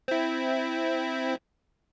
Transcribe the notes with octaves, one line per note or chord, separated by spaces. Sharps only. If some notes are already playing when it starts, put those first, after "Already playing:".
C4 E4